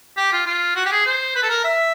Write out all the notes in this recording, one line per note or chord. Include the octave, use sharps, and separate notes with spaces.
G4
F4
F4
F#4
G4
G#4
C5
B4
A4
A#4
E5